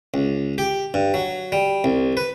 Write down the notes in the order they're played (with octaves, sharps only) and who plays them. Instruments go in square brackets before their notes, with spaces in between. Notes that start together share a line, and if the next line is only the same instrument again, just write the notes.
[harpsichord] C#2
G4
G2
F#3
G3
C2
B4